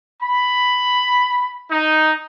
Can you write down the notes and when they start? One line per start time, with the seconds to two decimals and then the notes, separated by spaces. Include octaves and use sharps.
0.21 B5
1.70 D#4